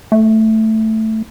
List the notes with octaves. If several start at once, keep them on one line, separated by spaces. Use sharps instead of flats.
A3